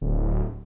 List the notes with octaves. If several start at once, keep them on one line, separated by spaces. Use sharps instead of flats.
D1